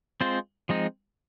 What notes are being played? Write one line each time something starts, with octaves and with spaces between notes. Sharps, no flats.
G#3 C4 F4 C5
F3 G#3 C4 D#4